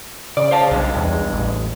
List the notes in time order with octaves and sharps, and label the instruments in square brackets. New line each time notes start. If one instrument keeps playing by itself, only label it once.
[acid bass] C#3 [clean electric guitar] D5
[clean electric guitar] C5 F5 A5
[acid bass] B1 [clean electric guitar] G2 G#3
[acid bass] E2
A1